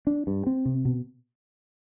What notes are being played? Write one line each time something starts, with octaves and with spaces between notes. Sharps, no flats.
D4
G2
C4
C3
B2